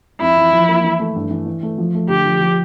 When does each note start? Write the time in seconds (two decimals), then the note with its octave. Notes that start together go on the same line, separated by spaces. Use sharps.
0.21 F2 E4
0.37 E3
0.53 F3
0.69 A#3
0.84 E3
1.00 A3
1.16 G2
1.31 E3
1.46 E3
1.63 A3
1.78 F3
1.95 A3
2.09 D3 G4
2.26 F3
2.41 F3